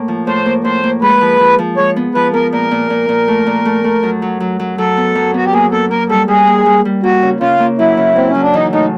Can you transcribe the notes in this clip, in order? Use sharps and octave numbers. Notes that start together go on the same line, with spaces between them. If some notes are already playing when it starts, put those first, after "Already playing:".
Already playing: A2 A#3
F3
A2 C5
A#3
A2 C5
A#3
G#3 B4
F3
F3
F3
G#3 C#5
B3
F3 B4
B3 A#4
A#2 A#4
A#2
A#2
A#2
A3
A#2
A3
A3
F#2
F#3
F#3
F#3
F#3 A4
B3
F#2
B3 F#4
G4
A#3 G#4
A#3 A4
A#3 A#4
G3 A4
G3 G#4
A#3
G3
G3
A#3 F#4
C#3
C#3 F4
A#3
F#3 E4
C#3
A#3 C4
C#4
F#3
D4
E3 D#4
A2 D#4